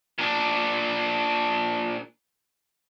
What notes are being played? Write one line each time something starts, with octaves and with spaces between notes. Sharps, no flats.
A#2 D4